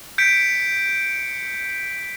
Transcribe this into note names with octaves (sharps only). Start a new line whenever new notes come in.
G6 B6 C#7 D7